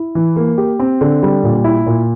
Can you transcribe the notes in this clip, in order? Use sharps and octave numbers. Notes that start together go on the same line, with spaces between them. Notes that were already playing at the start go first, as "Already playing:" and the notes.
Already playing: E4
E3
A#3
G4
C4
D3
G3
A#2
E4
A#2